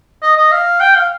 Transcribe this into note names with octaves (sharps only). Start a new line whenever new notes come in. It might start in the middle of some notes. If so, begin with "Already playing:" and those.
D#5
D#5
F5
G5
F5